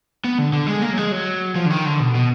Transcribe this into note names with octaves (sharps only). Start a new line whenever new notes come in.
B3
D3
D3
G#3
A#3
F#3
G#3
F#3
F3
D3
D#3
D3
B2
B2